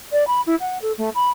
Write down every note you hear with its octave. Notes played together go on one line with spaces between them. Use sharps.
D5
B5
E4
F#5
A4
A3
B5